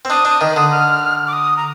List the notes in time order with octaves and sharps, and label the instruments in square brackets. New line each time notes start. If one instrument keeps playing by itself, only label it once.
[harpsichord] C4
[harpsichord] D4 [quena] D#6
[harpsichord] D4
[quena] D#6
[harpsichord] D#3
[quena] D#6
[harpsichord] D3
[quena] F6
D6
D#6
A#5